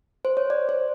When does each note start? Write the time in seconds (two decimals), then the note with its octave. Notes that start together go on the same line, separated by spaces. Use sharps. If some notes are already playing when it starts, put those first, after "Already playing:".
0.25 C5
0.37 C#5
0.50 D5
0.69 C5